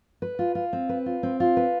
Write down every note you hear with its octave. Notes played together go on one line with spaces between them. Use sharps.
B4
F4
F4
C4
B4
F4
C4
F4
B4